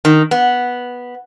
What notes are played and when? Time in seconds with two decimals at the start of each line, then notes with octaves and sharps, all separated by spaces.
0.05 D#3
0.31 B3